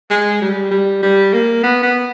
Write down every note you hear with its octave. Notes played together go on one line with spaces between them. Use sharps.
G#3
G3
G3
G3
A#3
B3
B3